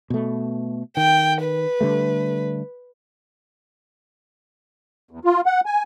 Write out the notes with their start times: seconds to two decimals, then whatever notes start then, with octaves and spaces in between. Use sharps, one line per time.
0.10 B2 A3
0.97 D#3 G5
1.44 B4
1.81 D3 G3 A3
5.11 E2
5.25 F4
5.46 F#5
5.66 G#5